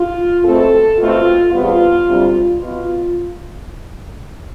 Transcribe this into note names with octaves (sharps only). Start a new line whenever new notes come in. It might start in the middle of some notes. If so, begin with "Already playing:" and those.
Already playing: F4
B2 A3 C4 A4
B2 A3 C4 F4
E2 C3 G3 B3 F4
D2 C3 G3 C4
B2 B3 F4